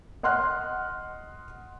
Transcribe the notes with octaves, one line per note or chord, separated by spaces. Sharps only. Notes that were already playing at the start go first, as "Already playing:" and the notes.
D#5 F#5 C6 F6 F#6